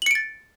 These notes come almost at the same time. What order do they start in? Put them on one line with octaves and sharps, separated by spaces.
F#7 C#7 D7 A6